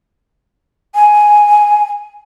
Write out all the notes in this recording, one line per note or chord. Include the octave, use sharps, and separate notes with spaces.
G#5